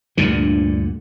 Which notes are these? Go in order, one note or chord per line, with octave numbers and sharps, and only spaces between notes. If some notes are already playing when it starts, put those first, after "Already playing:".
D2 G2 A#2 D3